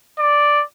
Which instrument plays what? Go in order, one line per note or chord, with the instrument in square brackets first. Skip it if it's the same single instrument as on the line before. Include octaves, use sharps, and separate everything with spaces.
[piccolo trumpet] D5